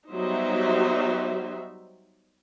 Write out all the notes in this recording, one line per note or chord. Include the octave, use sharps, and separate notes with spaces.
F#3 G3 B3 D#4 C5 E5